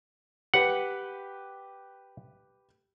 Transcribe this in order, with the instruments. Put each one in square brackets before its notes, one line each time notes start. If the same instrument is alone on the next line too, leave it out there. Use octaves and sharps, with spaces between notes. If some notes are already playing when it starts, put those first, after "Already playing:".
[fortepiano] G4 B4 [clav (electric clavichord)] F#5